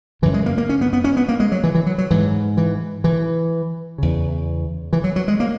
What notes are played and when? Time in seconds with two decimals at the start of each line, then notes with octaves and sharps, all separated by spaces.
0.22 F#2 C#3 E3
0.34 G#3
0.46 A#3
0.58 A#3
0.69 C#4
0.81 B3
0.93 B3
1.04 C#4
1.17 B3
1.28 A#3
1.40 G#3
1.52 F#3
1.64 E3
1.75 E3
1.86 F#3
1.98 F#3
2.11 G#2 E3
2.57 E3
3.04 E3
3.98 E2 C#3
4.93 E3
5.04 F#3
5.16 F#3
5.28 G#3
5.40 A#3